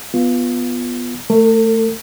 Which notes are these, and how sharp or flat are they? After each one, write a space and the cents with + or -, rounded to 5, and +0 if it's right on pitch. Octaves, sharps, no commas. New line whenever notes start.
B3 +0 F4 +0
A3 +10 A4 +45